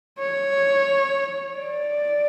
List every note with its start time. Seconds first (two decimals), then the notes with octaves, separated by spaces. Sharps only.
0.19 C#5
1.58 D5